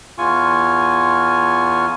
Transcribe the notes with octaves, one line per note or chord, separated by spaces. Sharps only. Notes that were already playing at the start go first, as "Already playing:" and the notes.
E2 F4 G#5 C#6